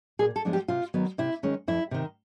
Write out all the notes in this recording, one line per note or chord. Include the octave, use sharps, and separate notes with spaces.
A#2 G#4
A4
F3 G#3 B3 D4
G4
C3 F4
D#3 F#3 B3
C3 E4
D#3 G#3 C#4
F2 E4
C3 D#3